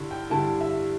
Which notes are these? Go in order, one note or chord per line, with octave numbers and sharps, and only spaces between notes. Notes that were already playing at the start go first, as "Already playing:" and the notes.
Already playing: G2 D3 E4
G5
G2 D3 G3 E4 A5
E5